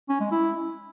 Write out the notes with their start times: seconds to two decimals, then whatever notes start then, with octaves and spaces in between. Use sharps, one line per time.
0.09 C#4
0.21 G#3
0.32 E4